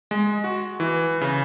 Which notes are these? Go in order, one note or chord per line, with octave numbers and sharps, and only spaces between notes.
G#3
F#4
E3
C#3